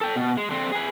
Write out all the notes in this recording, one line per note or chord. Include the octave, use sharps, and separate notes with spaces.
A4 G5
B2
G#3
D3 C4
G#4 B4